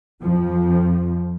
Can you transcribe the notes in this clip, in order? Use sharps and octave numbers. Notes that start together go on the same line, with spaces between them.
F2 F3